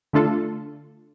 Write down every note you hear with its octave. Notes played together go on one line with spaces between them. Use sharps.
D3 A3 D4 F4 A4